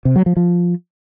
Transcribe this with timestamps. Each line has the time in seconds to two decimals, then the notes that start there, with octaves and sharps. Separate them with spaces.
0.05 C3
0.16 F#3
0.26 F3
0.37 F3